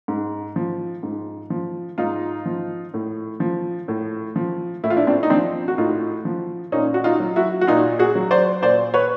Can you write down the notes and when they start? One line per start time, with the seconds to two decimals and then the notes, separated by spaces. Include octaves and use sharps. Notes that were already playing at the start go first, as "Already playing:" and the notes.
0.08 G#2
0.56 F3
1.03 G#2
1.50 F3
1.98 G#2 D#4 F4
2.46 F3
2.94 A2
3.40 F3
3.88 A2
4.36 F3
4.84 A2 E4
4.90 F4
4.97 D4 E4
5.07 C4 D4
5.23 D#4
5.30 F3 C4 D4
5.68 F#4
5.78 A2 D#4 F4
6.25 F3
6.72 A#2 C#4 D#4
6.94 F#4
7.04 D#4 F4
7.20 F#3
7.36 E4 F#4
7.61 F#4
7.67 A#2 D#4 F4
7.99 F#4 G#4
8.15 F#3
8.31 C5 D5
8.62 A#2 C5 D5
8.94 B4 C#5